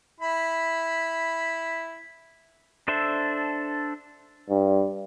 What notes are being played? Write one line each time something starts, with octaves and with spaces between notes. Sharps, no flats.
E4 B5
D4 A4 C5 E5
G2